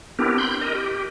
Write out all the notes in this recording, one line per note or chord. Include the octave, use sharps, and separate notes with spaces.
B3 C4 D4 E4 G4 A#4
B5 C6 G6
A#4 D#5
G4